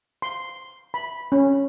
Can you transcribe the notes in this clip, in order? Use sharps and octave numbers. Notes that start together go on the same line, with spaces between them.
C6
B5
C#4